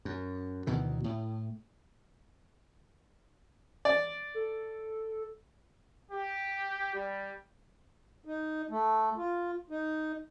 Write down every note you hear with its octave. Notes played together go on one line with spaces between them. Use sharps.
F#2
D2 B2 D#3 E3
A2
D5
A4
G4
G3
D#4
A3
F4
D#4